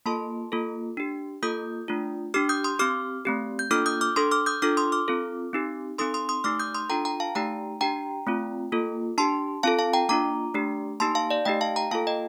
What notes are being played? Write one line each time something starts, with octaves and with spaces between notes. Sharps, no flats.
A#3 F4 A4 A5 C6
A#3 F4 A4
D4 G4
A#3 F4 A4 D#6 G6
A3 D4 F4
D4 G4 D6 F6
D#6 G6
C6 D#6
C4 G4 D6 F6
A3 C4 G4
G6
A#3 D4 F4 A4 D6 F6
D#6 G6
D6 F6
D4 A4 C6 D#6
D6 F6
D#6 G6
D4 F4 A4 D6 F6
C6 D#6
D6 F6
C4 F4 A4
C4 D#4 G4
C4 D#4 A4 C6 D#6
C6 D#6
C6 D#6
A3 D#4 G4 D6 F6
D#6 G6
C6 D#6
D4 F4 A4 G5 A#5
G5 A#5
F5 A5
A3 D#4 G4 G5 A#5
D4 G4 G5 A#5
A3 C4 F4
A#3 F4 A4
D4 G4 A5 C6
C4 F4 A4 F5 A5
F5 A5
G5 A#5
A#3 D4 F4 A#5 D6
A3 D4 G4
A#3 D#4 G4 A5 C6
F5 A5
D5 F5
A3 D#4 G4 D#5 G5
F5 A5
G5 A#5
A#3 F4 A4 F5 A5
D#5 G5